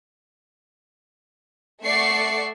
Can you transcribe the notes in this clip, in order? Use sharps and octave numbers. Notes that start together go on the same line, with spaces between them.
A3 D5 E5 F#5 C#6 C7